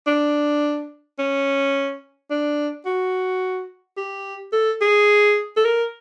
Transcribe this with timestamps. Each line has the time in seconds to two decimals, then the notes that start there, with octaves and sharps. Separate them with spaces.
0.07 D4
1.19 C#4
2.31 D4
2.86 F#4
3.97 G4
4.53 A4
4.82 G#4
5.57 A4
5.65 A#4